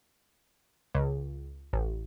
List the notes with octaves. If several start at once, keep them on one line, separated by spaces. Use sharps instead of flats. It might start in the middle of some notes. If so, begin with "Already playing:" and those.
C#2
A1